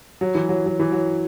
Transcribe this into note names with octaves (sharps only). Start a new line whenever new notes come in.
F#3
E3
F#3
F#3
E3
F#3